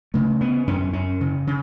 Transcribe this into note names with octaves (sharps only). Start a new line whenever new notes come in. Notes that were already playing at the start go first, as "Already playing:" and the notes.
C#3 A3
C#3 B3
F#2 C#4
F#2 C#4
C#3
C#3